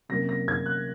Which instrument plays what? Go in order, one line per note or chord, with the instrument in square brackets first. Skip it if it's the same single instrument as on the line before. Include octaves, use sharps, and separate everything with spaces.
[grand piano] C3 F#3 A#3 C#4 A#6
A#6
G#6
F#6